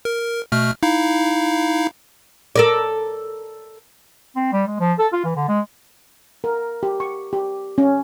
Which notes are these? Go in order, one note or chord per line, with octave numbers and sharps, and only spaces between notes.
A#4
B2 A3 F6
D#4 E4 F5
A4 A#4 D5
C4
G3
G#3
F3
A4
F4
E3
D3
G#3
A#4
G4
C#6
G4
C#4